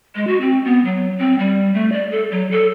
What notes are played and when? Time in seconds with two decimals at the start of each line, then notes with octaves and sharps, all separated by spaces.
0.15 G#3
0.27 F#4
0.41 C4
0.65 B3
0.85 F#3
1.18 C4
1.39 G3
1.74 A3
1.92 D5
2.11 A4
2.31 F#3
2.51 A4